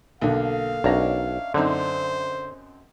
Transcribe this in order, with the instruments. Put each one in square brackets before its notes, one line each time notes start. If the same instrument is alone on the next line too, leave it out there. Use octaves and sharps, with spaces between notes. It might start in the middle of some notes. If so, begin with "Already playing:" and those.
[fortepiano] B1 D3 [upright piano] A#3 A4 [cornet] F5
[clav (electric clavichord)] B1 A#5 [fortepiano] C#4 D4 [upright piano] A#4 D#5 E5
[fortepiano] F#2 C4 D#4 [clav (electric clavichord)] D3 [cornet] C5